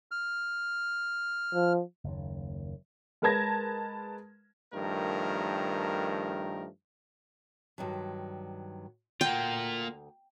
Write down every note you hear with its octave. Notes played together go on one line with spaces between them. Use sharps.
F6
F3
F#1 D#2
G#3 A#4 B4 A5 G#6 A#6
G2 D#3 F3 A3 A#4
G2 D#3 F#3
D2 A#3 F4 F#5 G5